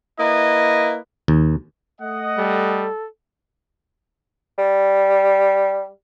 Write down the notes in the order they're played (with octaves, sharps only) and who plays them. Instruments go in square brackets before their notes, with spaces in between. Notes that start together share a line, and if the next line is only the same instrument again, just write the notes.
[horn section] A#3 E4 B4 D#5
[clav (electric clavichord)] D#2
[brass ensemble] A3 D#5 F#5
[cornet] G3 [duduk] A4
[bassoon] G3